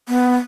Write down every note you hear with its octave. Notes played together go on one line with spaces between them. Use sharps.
B3